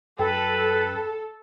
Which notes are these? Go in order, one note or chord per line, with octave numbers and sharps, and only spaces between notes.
F#2 A4 B4 G5